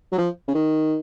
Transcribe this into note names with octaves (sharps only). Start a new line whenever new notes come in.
F#3
F3
C#3
D#3